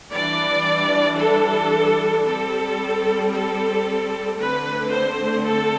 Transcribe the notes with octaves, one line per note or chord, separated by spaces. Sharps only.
E3 G3 D4 D5
A4
G3 C4 A4
A4
D3 A3 C4 B4
C5
A4